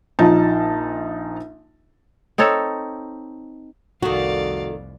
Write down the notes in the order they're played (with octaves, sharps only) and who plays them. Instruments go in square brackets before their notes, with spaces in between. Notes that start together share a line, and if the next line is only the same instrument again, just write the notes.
[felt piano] A#1 F3 D#4 A5
[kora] C4 D#4 A4 C#5
[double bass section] F1 C2 F2 [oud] D#3 A3 [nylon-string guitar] F#4 [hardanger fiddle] D5 F5